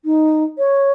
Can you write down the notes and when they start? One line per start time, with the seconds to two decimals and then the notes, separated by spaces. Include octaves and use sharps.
0.05 D#4
0.58 C#5